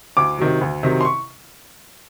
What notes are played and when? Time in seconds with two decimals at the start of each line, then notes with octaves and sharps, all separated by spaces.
0.17 D2 D6
0.38 C3 D#3 F#3
0.61 D2
0.83 C3 D#3 F#3
1.01 C6
1.05 C#6